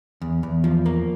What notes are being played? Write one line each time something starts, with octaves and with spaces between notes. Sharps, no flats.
E2
E2
F3
A#3